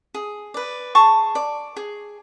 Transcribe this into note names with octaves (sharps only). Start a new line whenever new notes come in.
G#4
B4 D5
G#4 A5 C#6
D5
G#4